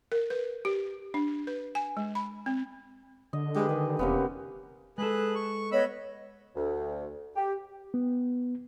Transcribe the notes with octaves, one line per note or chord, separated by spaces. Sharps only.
A#4
B4
G4
D4
B4
G#5
G#3
B5
C4
D3 D#5
G#3 G4 G#4 B4
D#3
E1 C3 A#3 B3 C#4
G#3 G#4 A4 B4 F#6
C#6
B3 C#5 D#5 B5 E6
D2
G4
B3